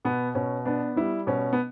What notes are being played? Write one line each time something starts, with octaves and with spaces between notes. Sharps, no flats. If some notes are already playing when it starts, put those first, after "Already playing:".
B2 B3
B2 C#4
B3 D4
G3 E4
B2 C#4
B3